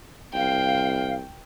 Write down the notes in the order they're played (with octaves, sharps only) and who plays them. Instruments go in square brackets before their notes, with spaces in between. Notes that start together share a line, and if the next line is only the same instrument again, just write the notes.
[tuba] C2 [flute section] F5 [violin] G5